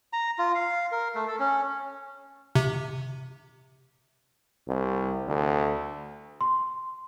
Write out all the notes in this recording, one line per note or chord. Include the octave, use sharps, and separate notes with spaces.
A#5
F4
F5
A#4
A3
A4
C#4
C3
C2
D2
C6